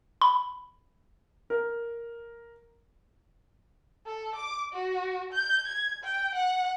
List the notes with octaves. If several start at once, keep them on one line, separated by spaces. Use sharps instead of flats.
B5
A#4
A4
D6
F#4
G6
G#6
G5
F#5